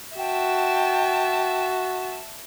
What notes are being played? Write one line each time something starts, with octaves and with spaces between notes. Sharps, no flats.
F#4 E5 G5 A5